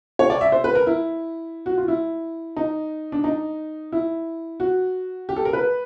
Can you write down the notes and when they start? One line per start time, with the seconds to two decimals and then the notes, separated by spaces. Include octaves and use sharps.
0.19 C#5
0.30 D5
0.41 E5
0.52 C5
0.64 B4
0.75 A#4
0.87 E4
1.66 F#4
1.78 F4
1.88 E4
2.57 D#4
3.12 D4
3.24 D#4
3.92 E4
4.60 F#4
5.29 G4
5.36 A4
5.45 A#4
5.53 B4